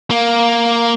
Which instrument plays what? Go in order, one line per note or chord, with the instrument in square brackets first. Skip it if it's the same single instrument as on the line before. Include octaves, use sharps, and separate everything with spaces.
[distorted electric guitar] A#3